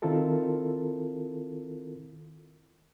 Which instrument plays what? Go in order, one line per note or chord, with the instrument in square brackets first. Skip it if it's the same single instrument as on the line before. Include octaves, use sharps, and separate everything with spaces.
[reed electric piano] D#3 C4 E4 F4 A4 A#4